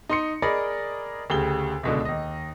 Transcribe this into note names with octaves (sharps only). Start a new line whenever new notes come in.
D#4 C6 C#7
G#4 A#4 D5 D#5 B5
D2 C#3 G4 G7
C#2 B2 D3
D#2 D#5